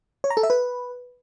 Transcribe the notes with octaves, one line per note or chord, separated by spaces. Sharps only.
C#5
A#5
A4
E5
B4